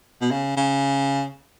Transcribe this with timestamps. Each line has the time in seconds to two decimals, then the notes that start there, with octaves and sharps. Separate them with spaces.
0.22 B2
0.31 C#3
0.57 C#3